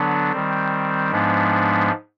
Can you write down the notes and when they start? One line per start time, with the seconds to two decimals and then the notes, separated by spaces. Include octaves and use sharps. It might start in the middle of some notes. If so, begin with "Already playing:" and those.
Already playing: D3 F#3 B3 D4
0.31 D#3 G3 C4
1.12 G#2 F3 G#3 B3 D4